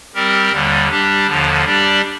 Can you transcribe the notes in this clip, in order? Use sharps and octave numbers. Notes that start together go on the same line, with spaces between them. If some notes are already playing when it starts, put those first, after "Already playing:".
G3 C4 G4 A#4
D#2 D3 G3
G3 D4 G4
D#2 D3 F3
G3 D4 G4 D5